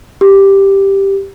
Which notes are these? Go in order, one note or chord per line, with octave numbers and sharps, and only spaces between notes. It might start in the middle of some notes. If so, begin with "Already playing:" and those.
G4